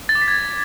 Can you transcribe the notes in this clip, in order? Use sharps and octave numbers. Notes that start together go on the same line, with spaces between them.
A6
D6
B6
G#6